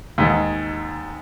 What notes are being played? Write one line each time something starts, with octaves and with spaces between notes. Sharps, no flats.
D#2 G#2